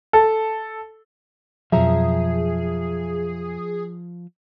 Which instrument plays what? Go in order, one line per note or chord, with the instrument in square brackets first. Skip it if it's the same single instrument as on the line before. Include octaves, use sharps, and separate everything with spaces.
[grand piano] A4
[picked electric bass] F2 B2 F#3 [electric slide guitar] F3 [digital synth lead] G#4 [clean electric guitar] E5 A#5